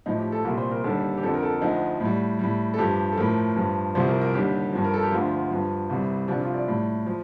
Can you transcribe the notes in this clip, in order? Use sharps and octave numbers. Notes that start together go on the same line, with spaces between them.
A2 F3 D#4
G4
A4
C2 A#2 G3 A#4
C5
A#4
D#2 D3 G3 A4
G4
F2 D3 F3 A4
A#4
A4
D2 D3 F3 D#4
A2 G3
A2 G3
A4
G2 F3 G4
A4
A2 F3 A#4
G2 F3
C2 C3 F3 C5
A#4
A#4
D#2 D3 G3 G4
G2 F3
A#4
A4
G4
D2 D3 F3 F4
G2 F3
C2 C3 G3
C2 C3 F3 D4
F4
D5
A2 G3
F3